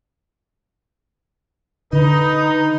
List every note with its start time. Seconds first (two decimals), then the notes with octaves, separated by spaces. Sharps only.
1.93 D3 D#4 B4